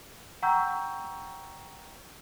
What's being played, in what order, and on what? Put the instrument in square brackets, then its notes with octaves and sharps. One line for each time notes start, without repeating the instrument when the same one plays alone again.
[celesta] F#5 G5 A#5 C#6 E6 G6